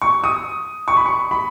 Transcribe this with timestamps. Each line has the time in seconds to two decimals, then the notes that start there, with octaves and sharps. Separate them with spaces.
0.02 C#6
0.24 D#6
0.88 C#6
0.97 B5
1.06 C#6
1.31 B5